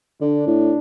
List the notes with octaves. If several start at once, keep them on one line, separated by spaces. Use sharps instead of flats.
D3 D4
A2